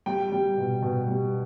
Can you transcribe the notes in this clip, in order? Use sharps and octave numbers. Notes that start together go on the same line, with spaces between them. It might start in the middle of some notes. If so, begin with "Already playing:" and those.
G3 G5
G3
B2
B2
G3